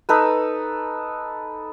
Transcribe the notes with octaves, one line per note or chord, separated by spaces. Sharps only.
D#4 A4 B4